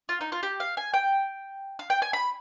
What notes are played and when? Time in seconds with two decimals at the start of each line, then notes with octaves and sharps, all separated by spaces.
0.09 F4
0.21 D#4
0.32 F4
0.43 G4
0.60 F5
0.77 G#5
0.94 G5
1.79 F5
1.90 G5
2.02 G#5
2.13 B5